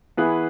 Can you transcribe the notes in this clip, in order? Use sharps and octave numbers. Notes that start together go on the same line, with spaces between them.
E3 B3 E4 G#4 B4